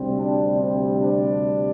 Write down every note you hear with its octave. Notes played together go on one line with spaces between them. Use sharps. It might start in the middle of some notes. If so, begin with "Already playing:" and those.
Already playing: D2 C3 G3 C4
D4
C4
D4